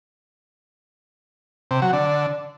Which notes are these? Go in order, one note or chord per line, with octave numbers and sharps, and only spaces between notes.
C3
F#3
D3